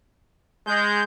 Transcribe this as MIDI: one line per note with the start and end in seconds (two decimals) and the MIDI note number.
0.67 1.02 56
0.67 1.03 91